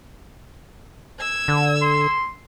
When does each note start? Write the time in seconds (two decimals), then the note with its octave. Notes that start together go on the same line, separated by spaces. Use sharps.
1.19 E6 G#6
1.48 D3
1.82 C6